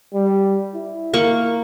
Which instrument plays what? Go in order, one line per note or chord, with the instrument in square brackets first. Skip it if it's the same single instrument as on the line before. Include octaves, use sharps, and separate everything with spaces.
[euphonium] G3
E4
[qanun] A#3 C#6